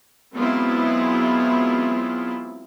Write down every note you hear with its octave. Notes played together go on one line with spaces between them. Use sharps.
F#3 G#3 B3 C4 E4 F4